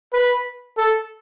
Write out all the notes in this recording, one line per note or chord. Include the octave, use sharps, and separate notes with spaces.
B4
A4